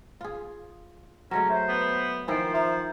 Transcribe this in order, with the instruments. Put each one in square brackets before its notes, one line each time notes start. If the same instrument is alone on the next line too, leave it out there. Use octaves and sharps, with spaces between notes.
[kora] F4 G#4
[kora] F#3 G#3 A3 [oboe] C#4
[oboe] C5 [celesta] E5
[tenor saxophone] B3
[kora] D#3 E4 F4 [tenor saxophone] F3 [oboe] C5 [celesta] G#5 D7
[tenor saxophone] F3 [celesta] E5 A#5